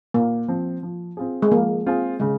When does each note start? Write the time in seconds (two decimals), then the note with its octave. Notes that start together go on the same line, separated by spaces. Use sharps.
0.14 A#2 A#3
0.48 F3 C4
0.83 F3
1.17 C4 F4 G#4
1.42 G#3
1.51 F3 A#3
1.86 C4 F4 G#4
2.20 C#3 G#3